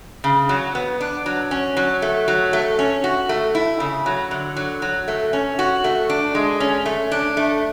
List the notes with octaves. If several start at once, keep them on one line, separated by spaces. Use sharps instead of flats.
C#3
F#3
B3
D4
F#3
C#4
F#3
A3
F#3
A3
C#4
F#4
A3
E4
C#3
F#3
D3
F#3
F#3
A3
C#4
F#4
A3
D4
G#3
C#4
A3
D4
A3